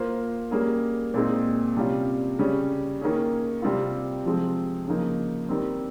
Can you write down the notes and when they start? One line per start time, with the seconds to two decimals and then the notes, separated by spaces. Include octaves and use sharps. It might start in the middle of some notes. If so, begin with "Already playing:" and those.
Already playing: A#3 F4 C5
0.51 G3 A#3 C#4 G#4
1.14 A#2 G#3 C4 D#4
1.77 C3 G3 C#4 F4
2.39 C#3 G3 C#4
3.01 D#3 A#3 C#4 G#4
3.62 C3 G3 C4 F4
4.25 C3 F3 G#3 C4
4.88 C#3 F3 A#3 D#4
5.49 D#3 G3 C4